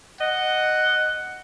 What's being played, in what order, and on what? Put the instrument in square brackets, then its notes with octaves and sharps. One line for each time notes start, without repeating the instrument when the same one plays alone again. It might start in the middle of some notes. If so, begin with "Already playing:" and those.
[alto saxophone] D#5 [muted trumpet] F#5